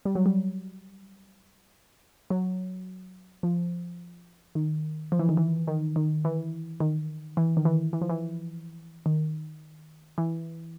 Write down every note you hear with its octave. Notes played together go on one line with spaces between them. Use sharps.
G3
F#3
G3
F#3
F3
D#3
F3
E3
D#3
E3
D#3
D#3
E3
D#3
E3
D#3
E3
E3
F3
E3
D#3
E3